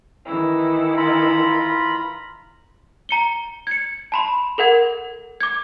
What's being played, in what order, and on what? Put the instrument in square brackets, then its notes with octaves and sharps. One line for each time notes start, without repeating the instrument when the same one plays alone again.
[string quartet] D#3 E3 E4
[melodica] F4 A#5 B5
[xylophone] A#5 C#7 G7
G#6 C#7
A5 B5 C6
A4 A#4 F#5 G#6
D6 G#6